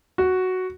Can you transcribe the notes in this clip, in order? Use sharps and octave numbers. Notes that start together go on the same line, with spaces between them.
F#4